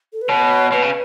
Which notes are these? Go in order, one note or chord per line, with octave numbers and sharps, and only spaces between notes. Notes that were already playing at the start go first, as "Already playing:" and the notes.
A4
B4
B2 C#5
B2 B4
C#3